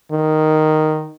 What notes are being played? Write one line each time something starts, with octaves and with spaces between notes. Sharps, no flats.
D#3